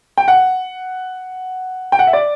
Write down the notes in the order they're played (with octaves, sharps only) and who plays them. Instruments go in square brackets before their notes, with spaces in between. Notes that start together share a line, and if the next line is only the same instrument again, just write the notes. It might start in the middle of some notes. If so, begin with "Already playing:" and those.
[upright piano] G5
F#5
G5
F#5
E5
D5